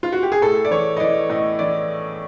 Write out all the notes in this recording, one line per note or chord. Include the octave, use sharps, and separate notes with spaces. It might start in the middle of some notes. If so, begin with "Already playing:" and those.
F4
F#4
G4
G#4
A2 A4
D5
E3 C#5
D#5
E3 D5
A2 D#5
E3 D5